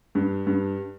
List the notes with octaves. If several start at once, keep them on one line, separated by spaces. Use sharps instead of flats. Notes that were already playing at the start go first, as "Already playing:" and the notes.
G2
G2